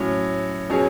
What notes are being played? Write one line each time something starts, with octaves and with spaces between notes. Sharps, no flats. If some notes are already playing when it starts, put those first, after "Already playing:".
Already playing: A2 F#3 C#4
B2 F#3 C#4 G#4